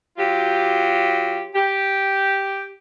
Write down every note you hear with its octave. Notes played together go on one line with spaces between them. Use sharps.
F#3 F4 G4
G4